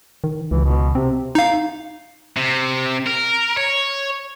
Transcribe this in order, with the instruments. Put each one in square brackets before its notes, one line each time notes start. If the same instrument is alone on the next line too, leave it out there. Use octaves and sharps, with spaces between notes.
[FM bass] D#3
[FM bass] C#2 [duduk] E3
[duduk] B2
[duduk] C3 [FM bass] C4
[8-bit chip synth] D#4 F5
[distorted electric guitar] C3
A#4
C#5